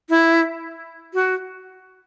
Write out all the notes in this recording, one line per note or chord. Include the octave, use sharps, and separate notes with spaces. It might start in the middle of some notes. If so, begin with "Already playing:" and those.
E4
F#4